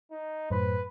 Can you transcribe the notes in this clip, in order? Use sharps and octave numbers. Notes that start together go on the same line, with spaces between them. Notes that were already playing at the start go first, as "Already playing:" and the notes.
D#4
F#2 A2 B4 C5